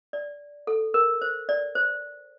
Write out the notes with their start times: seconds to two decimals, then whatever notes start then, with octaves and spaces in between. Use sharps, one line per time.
0.13 D5
0.67 A4
0.94 A#4
1.22 C5
1.49 D5
1.75 C5